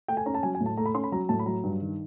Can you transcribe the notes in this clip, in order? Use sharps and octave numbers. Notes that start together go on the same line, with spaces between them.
A3 G5
G#5
C#4 A#5
A5
F#3 G#5
G#5
A2
A5
A3 A#5
B5
C#4 C6
B5
F#3 A#5
A2 A5
B5
F#3 A#5
G2
D#3